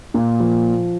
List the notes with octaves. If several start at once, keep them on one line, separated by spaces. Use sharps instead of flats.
A#2
F3